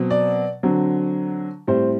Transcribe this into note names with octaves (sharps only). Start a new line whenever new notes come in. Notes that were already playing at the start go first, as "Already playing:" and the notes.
Already playing: B2 F#3 C4
D5
D3 F#3 C4
A2 G3 C4 C5